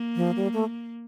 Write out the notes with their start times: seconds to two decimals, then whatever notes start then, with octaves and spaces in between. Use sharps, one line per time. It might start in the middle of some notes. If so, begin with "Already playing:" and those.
Already playing: A#3
0.16 F3
0.36 G3
0.53 A3